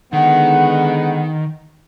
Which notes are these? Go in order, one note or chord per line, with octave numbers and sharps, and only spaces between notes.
D3 D#3 G#3 B3 F#5